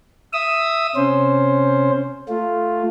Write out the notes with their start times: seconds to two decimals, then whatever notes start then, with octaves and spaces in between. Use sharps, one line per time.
0.33 E5 D#6 E6
0.96 C3 C#4 C5
2.29 A3 F4